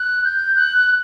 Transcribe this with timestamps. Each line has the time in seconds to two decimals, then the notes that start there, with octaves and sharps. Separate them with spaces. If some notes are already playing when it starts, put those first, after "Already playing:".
Already playing: F#6
0.24 G6
0.56 F#6